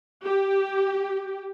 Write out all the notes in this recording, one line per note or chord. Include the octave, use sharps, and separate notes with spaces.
G4